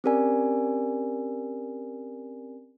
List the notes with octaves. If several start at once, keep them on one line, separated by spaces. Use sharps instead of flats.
C4 C#4 G4 A#4 D5 G#5